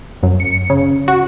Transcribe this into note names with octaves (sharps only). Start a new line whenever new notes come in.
F#2
C#7
C#3
F#4